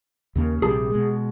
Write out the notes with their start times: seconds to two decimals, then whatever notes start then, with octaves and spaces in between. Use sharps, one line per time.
0.36 D#2 C#3 A#3
0.62 A#1 C3 G3 G#4 A5
0.91 B2 G#3